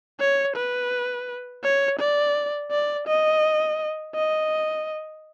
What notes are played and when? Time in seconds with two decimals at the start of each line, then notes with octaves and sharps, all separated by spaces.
0.20 C#5
0.56 B4
1.64 C#5
1.99 D5
2.71 D5
3.08 D#5
4.15 D#5